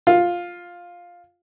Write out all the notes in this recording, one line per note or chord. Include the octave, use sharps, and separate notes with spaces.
F4